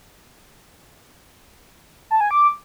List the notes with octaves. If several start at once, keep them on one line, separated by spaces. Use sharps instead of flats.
A5
G#5
D6